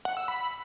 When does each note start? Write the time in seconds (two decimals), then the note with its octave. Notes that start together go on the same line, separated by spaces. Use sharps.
0.05 F#5
0.17 E6
0.28 B5